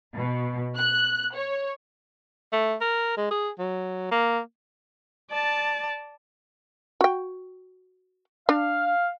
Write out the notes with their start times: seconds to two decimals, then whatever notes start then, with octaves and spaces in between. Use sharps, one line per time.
0.15 B2
0.77 F#6
1.35 C#5
2.53 A3
2.81 A#4
3.17 G#3
3.31 G#4
3.59 F#3
4.11 A#3
5.31 D5 A5
7.01 F#4 G5
8.49 D4 F5